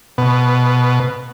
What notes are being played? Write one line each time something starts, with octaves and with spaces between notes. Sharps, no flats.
B2